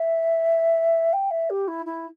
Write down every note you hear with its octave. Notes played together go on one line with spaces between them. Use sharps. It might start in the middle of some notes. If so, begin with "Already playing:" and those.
Already playing: E5
G5
E5
G4
E4
E4